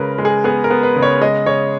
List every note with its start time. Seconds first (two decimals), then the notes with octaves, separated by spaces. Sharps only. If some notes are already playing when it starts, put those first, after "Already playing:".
Already playing: C#3 G#3 A#4 B4
0.18 G#3
0.25 G#4
0.44 B3 G#4
0.64 A#4
0.70 B3
0.83 B4
0.96 C#3
1.02 C#5
1.21 G#3 D#5
1.46 C#3 C#5